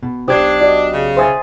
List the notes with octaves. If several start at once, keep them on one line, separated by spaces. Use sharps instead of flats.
B2
B1 D4 G4 C5 D#6 G#6 C7
F#4 D5 D#5 D#6
C#3
C5 E5 G#5 C6 D#6 A6